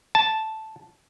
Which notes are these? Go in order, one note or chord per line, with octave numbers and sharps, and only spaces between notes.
A5